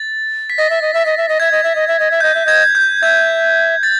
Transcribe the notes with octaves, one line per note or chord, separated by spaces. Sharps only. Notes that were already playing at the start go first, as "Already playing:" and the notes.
Already playing: A6
B6
D#5 A#6
E5
D#5
E5
D#5
E5
D#5
E5 G#6
D#5
E5
D#5
E5
D#5
E5
D#5 G6
E5
D#5 G#6
G6
E5 G#6
A6